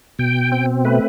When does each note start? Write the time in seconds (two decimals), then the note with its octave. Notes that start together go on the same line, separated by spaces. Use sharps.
0.19 B2 G5
0.52 C4
0.85 A3 B4